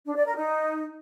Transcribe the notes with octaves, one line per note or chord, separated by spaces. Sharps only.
D4
D5
A#4
D#4